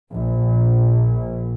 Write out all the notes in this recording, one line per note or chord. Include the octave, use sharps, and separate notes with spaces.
A#1